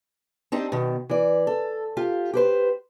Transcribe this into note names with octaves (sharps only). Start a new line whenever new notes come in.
C4 D4 D#4 G4
B2 D#3
E3 D5
A4
F4 G4
G4 B4 C5